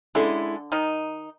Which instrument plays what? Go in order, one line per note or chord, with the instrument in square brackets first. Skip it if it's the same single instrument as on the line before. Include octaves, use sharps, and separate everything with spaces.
[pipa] D3 D4 [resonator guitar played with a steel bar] G#3 C#4 E4 A4
[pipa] D#3 D#4